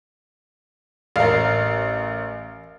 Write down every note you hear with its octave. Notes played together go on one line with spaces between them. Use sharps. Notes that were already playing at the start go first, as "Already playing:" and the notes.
A1 A#4 F5